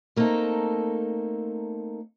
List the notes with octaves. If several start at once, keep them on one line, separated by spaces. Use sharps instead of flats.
A3 A#3 C4 D#4 A4